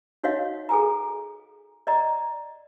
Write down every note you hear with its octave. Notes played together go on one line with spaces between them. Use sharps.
D#4 F#4 C#5 D#5 F5
G#4 A4 G#5 A#5
D5 D#5 A#5